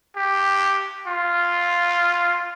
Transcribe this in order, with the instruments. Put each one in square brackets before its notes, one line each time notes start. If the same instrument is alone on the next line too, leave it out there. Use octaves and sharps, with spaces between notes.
[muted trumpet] G4
F4